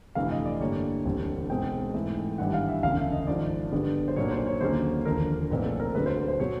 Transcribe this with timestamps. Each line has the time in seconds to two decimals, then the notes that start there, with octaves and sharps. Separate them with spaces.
0.15 G1 F2 C3 E3 A3 F5
0.31 D#5
0.45 D5
0.60 G2 D3 G3 A#3 C#5
1.05 E1 D2 D3 G3 C4
1.49 B1 B2 G#3 C4 G5
1.94 G#2 E3 A3
2.38 G#1 G2 E3 G3 F#5
2.54 F5
2.68 E5
2.83 E1 D2 C#3 F5
2.98 E5
3.12 D#5
3.27 G#1 G#2 F3 D5
3.72 G1 G2 D3 G3 B3
4.08 C5
4.16 B1 A#2 F#3 A#3 D4 C#5
4.31 C5
4.46 C#5
4.61 D#2 D3 F#3 A#3 C#4 C5
5.05 E1 D#2 D3 F3 A#4
5.50 B1 A#2 F3 A3 C4 B4
5.65 A4
5.80 A#4
5.95 D2 D3 F#3 B4
6.06 C5
6.16 B4
6.28 C5
6.40 B2 F#3 C#5